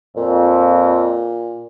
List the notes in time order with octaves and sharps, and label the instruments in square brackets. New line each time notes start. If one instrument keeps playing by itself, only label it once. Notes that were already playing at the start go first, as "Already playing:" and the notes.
[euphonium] F2 [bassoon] A#2